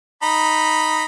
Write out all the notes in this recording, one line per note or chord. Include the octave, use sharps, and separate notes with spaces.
D#4 B5